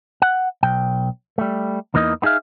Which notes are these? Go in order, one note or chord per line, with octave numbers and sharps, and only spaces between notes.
F#5
B1 G5
G3 A3
E2 E3 A#3 D#4 D#5
B3 D#4 G#4 E5 F5